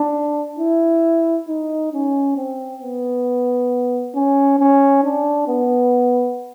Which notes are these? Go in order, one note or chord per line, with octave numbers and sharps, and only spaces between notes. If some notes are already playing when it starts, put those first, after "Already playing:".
Already playing: D4
E4
D#4
C#4
C4
B3
C#4
C#4
D4
B3